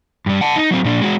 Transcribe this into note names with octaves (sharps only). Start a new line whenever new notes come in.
G2 G3
F#5 A5
D#4
F#3 C4
A#2 D4
G#3 F#4